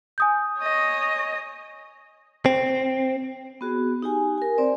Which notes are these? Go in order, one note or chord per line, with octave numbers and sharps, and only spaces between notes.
G#5 D#6 G6
C#5 D#5
C4
B3 F#4 G#4
D#4 G4 G#5
A#4 G#5
C4 C5 D5